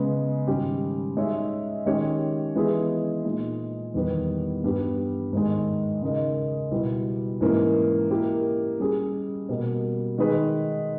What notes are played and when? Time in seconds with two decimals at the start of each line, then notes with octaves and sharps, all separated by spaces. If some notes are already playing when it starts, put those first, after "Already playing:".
Already playing: C#3 G#3 B3
0.47 G#2 D#3 G3 C#4 G4
1.17 G#3 D#4 G#4 C#5 E5
1.86 D#3 G#3 C#4 G4 C#5
2.56 E3 G#3 B3 E4 G#4
3.25 A#2 G#3 D#4
3.94 E2 D#3 G3 B3
4.64 G2 G3 B3 G4
5.33 G#2 D#3 G#3
6.02 C#3 G#3 D#4 A#4 D#5
6.72 B2 G3 B3 E4
7.41 G#2 E3 A#3 C#4
8.10 A#3 E4 G4 A#4
8.80 G3 C#4 G#4
9.49 B2 G3 A#3
10.18 D#3 G#3 D#4 G#4 B4